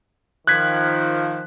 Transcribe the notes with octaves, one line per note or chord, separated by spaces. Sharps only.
D#3 F3 F#6 G#6 B6